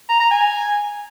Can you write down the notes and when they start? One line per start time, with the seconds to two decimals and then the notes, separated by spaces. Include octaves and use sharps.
0.09 A#5
0.20 A#5
0.31 G#5